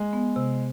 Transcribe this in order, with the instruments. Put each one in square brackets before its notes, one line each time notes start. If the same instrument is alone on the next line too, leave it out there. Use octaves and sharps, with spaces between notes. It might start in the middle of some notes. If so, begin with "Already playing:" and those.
Already playing: [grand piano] G#3
[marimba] B3
C3